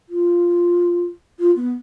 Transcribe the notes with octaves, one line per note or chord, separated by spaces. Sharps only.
F4
F4
B3